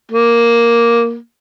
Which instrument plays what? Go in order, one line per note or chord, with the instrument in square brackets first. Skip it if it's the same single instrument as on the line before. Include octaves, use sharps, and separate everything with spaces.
[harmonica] A#3